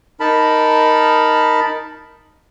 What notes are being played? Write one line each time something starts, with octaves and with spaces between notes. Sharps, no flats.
D#4 A#4 A5 B5